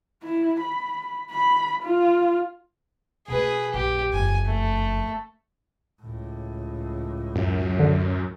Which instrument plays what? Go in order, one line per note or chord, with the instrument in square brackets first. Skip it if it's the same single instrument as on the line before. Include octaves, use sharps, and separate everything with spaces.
[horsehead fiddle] E4
B5
B5
F4
[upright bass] B2 A3 [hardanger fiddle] G#4 B4
[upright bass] A#1 F#2 [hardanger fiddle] G4
[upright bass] F#1 F2 [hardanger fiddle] G#5
[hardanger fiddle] A3
[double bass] C#2 A2
[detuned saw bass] F#2
[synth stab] D3